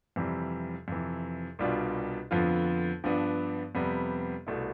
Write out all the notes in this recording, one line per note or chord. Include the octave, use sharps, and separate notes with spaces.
F2 C3 E3 G3
F2 C3 E3
C2 B2 G3 D4 F4
F2 D3 F3 B3 F4
G2 F3 B3 D4
F2 C3 G3 B3
C2 B2 A3 E4